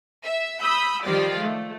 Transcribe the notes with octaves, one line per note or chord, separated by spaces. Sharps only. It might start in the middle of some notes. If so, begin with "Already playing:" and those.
E5
B5 D#6 E6 G6
D#3 F3 G3 F4 D5
A3